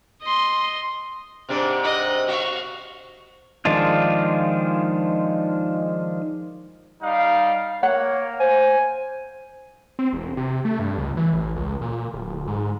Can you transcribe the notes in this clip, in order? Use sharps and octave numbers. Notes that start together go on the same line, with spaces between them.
D#5 C6
G#2 C3 G3 D4
D#5 F#6
F#4 F5 C#6
D#3 F3 G#3 D4 F4
G3 D#4 F5
A#3 C#5 F#5
C5 G#5
C4
E1
C3
A3
G2
C#2
E3
A1
C#2
A#2
D1
G#2